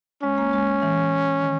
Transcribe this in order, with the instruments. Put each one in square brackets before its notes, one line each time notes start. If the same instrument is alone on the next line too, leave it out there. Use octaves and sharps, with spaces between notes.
[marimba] G#3 [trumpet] C#4
[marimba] A#3
G#3
E3
D#3